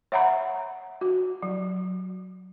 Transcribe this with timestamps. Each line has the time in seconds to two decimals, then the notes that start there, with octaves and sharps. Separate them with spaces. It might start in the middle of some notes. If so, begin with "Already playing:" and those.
0.12 C#5 E5 F#5 A#5 B5
1.01 F#4
1.42 F#3